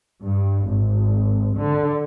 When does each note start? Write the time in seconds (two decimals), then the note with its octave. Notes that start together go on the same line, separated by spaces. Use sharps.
0.24 G2
0.68 G#1
1.57 D3